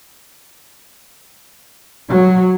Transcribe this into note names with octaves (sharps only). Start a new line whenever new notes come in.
F#3